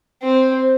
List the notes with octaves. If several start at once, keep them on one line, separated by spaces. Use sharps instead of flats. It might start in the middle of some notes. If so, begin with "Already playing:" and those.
C4 C5